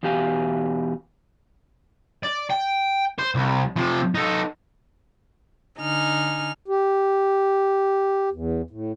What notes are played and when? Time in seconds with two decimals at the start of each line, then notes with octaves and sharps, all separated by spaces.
0.03 E2 B2 G4 F5 G#5
2.23 D5
2.50 G5
3.19 C5
3.35 C2
3.76 C3 F3
4.15 D#4 A4
5.80 D3 D#4 G#5 F6
6.68 G4
8.32 E2
8.70 A2